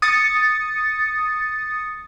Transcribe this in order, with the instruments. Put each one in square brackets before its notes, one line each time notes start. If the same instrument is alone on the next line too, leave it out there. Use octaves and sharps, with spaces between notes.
[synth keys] D#6 A6 C#7